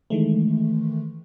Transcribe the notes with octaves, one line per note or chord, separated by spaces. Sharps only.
D#3 E3 G#3 A3